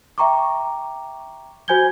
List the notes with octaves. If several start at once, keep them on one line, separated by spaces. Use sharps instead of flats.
E5 G5 A#5 C#6 D6
F#4 C5 G#5 G6 G#6 G7